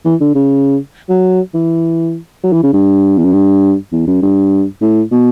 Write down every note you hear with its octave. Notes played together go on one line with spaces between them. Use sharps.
E3
D3
C#3
F#3
E3
F#3
E3
C#3
G2
E2
F#2
G2
E2
F#2
G2
A2
B2